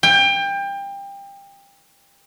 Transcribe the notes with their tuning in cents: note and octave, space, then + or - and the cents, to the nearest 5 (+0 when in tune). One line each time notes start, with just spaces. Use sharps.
G5 +25